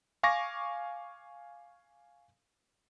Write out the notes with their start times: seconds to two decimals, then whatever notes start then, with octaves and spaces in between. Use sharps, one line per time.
0.23 F5 G#5 C#6 D6 A#6